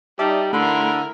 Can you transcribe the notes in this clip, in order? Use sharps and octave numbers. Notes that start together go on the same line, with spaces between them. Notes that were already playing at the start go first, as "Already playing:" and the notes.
G3 D#4 D5 E5 A5
D3 A3 E4 A#4 B5 C6